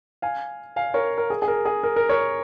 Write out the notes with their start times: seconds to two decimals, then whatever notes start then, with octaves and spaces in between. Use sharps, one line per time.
0.22 F5 G#5
0.76 F5 G#5
0.94 A#4 C#5
1.18 A#4
1.30 G#4
1.42 G#4
1.48 A#4
1.65 G#4
1.83 A#4
1.96 A#4
2.09 A#4 C#5